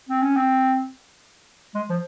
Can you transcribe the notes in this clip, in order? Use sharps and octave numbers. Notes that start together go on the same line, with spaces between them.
C4
C#4
C4
G#3
F3